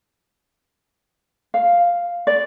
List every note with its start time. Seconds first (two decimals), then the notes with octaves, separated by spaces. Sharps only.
1.54 F5
2.27 D5